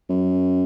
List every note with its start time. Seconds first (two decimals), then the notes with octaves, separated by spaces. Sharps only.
0.10 F#2